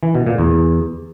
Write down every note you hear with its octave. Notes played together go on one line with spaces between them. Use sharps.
E3
B2
A#2
E2